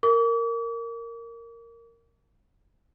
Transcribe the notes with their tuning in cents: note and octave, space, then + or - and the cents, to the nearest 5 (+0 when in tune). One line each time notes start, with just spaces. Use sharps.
A#4 -10 D6 -45